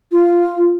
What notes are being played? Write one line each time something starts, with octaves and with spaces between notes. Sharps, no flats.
F4